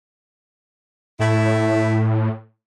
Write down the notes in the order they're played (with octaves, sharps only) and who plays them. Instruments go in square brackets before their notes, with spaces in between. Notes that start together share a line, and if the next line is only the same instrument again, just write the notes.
[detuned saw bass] A2 [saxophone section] A3 E4